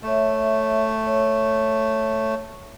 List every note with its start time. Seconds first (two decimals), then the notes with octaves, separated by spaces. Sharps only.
0.03 A3 C#5 E5
1.06 C#5